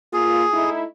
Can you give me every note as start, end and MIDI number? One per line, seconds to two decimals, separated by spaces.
0.13 0.45 58
0.13 0.45 65
0.13 0.70 68
0.54 0.84 57
0.54 0.84 63
0.54 0.84 64